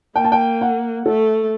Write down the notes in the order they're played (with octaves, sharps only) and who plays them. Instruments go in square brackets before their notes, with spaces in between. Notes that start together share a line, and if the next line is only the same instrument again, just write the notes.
[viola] A#3 [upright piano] G5
[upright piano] A5
G5
F#5
[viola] A3 [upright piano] A4